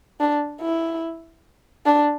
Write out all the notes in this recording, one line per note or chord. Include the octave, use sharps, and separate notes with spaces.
D4
E4
D4